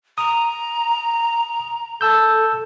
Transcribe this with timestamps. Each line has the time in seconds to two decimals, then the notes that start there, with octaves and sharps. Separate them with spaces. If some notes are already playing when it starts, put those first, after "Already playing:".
0.18 A#5 D#6
2.01 A4 A5 E6 G6